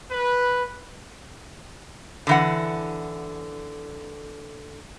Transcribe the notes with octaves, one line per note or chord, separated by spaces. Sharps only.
B4
D3 E3 F#5